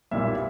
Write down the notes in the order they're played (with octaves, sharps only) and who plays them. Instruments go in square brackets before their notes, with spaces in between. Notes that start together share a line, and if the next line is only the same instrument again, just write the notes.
[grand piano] B1 A#2 G3 A#3 E4 E5